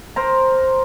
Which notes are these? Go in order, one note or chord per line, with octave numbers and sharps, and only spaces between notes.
A#4 C5 A#5